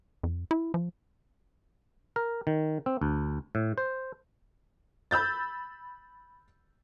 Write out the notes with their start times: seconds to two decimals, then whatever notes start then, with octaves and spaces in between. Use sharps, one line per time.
0.23 F2
0.51 E4
0.74 F3
2.16 A#4
2.47 D#3
2.86 C4
3.01 D2
3.55 A2
3.78 C5
5.11 B5 E6 G6 A6